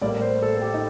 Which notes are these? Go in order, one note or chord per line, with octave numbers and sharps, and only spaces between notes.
A1 A2 G3 A#3 D5
C5
A4
A4
G4
D#4